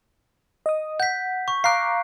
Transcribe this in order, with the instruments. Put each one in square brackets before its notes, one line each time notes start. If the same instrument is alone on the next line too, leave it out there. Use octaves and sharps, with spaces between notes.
[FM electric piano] D#5 D#6
[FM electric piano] F#5 [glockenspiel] G6 B6
[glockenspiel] C#6
[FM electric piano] F5 A#5 D6 [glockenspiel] F#6 C7